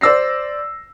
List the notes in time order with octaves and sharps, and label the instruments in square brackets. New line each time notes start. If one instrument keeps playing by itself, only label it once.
[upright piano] C5 D5 E6 A#6 C7